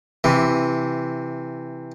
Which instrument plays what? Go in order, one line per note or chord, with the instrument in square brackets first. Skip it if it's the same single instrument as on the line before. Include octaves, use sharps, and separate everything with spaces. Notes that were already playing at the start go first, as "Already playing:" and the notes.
[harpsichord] C3 E3